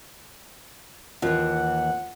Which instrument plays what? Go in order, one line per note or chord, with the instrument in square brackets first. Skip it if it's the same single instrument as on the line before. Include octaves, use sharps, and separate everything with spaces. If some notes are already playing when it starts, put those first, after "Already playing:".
[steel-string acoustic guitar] D#2 E3 [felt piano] F4 [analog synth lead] F#5